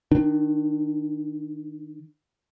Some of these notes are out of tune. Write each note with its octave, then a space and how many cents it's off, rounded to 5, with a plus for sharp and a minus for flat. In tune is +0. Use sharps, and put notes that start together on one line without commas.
D#3 +0 D4 +25